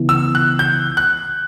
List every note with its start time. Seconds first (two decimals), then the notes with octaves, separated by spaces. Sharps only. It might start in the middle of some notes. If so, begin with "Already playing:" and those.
Already playing: C#3 E3 B3 E4
0.09 E6
0.35 F#6
0.59 G6
0.97 F#6